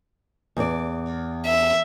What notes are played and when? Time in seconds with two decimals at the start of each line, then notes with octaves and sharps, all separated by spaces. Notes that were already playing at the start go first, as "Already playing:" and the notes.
0.57 E2 D5
1.46 E5